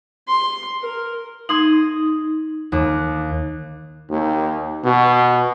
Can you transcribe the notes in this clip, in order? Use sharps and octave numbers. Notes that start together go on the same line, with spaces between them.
C6
A#4
D#4 C6 D#6 G#6
D#2 D6
D#2
B2